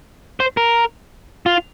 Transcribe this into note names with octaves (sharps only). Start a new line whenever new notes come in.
C5
A#4
F4